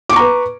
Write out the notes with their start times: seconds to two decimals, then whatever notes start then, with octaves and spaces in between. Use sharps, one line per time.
0.09 D6
0.13 C#6
0.16 A#5
0.19 B4